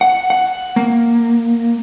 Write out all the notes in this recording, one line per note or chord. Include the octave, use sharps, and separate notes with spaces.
F#5
F#5
A#3